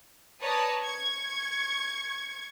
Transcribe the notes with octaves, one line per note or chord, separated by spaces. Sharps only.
B4 C#5 D5 A5 A#5 D#6
C#6 G#6